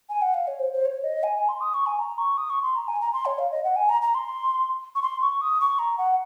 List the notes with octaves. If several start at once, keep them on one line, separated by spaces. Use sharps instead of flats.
G#5
F#5
F5
C#5
C5
C5
C#5
D#5
G#5
G#5
C6
D#6
C#6
G#5
A#5
C#6
D#6
C#6
C6
A#5
G#5
A#5
C6
C#5
F5
D#5
F#5
G#5
A#5
A#5
C6
C#6
C6
C#6
D#6
C#6
A#5
F#5